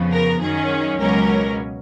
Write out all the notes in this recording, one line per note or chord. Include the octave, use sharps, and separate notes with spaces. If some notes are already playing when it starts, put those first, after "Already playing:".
Already playing: F2 C#3 F3 B3
A#4
F#2 D#3 F#3 C#4 G#4
C#2 B2 F#3 C#4 A#4